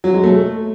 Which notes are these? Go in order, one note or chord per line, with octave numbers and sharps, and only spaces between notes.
F#3
G#3
A3